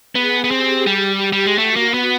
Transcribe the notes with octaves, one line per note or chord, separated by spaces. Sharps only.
B3 G#4
B3
C4 G4
G3
G4
G3
G#3
A3 F#4
A#3
B3